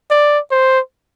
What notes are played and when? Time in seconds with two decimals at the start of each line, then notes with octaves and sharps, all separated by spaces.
0.10 D5
0.51 C5